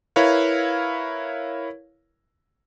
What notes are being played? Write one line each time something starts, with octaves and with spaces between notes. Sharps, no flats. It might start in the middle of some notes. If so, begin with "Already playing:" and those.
E4 A#4 B4 C#5 F5